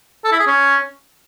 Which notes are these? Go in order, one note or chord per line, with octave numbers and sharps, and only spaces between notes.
A4
E4
G#4
C#4